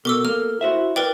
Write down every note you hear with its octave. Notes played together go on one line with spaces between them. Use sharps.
B2 A4 A#4 D6 E6
A#3 F6
E4 F#4 C5 E5
A#4 B4 D5 G5